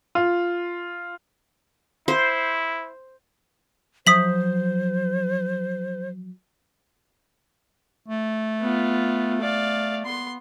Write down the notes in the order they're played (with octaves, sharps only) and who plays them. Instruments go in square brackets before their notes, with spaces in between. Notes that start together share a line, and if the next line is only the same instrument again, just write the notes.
[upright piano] F4
[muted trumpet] E4 [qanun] C5
[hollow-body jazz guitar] F3 F#3 E5 [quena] C5 [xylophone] D#6 B6 F#7
[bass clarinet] A3
[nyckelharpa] B3 F4
D5 F5
[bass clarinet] B3 [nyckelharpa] C6